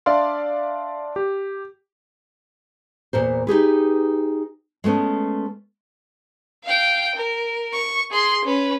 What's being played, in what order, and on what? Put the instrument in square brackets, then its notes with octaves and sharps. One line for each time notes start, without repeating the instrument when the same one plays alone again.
[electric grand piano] D4 D5 E5 F5 C6
G4
[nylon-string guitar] E2 A#2 A#4 C5
D#4 G4 G#4 B4
G#3 A3 B3 C#4
[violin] F5 G5
A#4
C#6
G#4 C6
C#4 B4